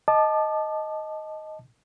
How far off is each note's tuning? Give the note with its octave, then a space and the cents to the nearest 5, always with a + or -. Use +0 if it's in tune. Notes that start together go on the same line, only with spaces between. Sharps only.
D#5 +5 A5 -10 D6 +35